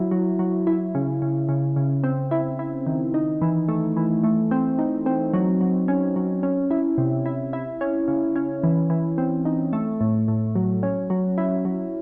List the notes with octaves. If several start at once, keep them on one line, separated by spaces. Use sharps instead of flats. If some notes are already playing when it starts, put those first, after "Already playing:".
Already playing: F#3 E4
F#3
F#3
E4
C#3
C#3
C#3
C#3
C4
E4
E4
D#3
D#4
E3
A3
E3
A3
C4
D#4
C4
F#3
F#3
C#4
F#3
C#4
E4
C3
E4
E4
C#4
C#3
C#4
E3
E3
C4
D#4
A3
A2
A2
F#3
C#4
F#3
E4
F#3